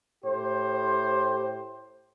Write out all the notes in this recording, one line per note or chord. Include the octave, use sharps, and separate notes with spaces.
A2 G4 C5